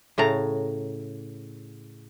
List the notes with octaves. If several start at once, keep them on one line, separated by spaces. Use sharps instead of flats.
A2 C#3 A5 A#5